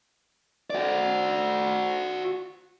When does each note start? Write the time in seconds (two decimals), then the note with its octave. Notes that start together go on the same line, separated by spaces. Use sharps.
0.70 F#4 D5